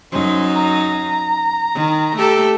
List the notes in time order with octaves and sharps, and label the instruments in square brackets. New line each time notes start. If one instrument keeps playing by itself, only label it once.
[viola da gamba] F#2 D#4 [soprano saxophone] C5
[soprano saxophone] A#5
[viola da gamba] D#3
A3 G4 A4